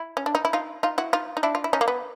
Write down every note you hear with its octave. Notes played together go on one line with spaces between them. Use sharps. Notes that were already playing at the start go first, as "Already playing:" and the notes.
Already playing: E4
C#4
D4
D#4
E4
D#4 F4
D#4 F4
E4 F#4
D#4 F4
D#4
D4 E4
F4
E4
C#4 D#4
A#3
B3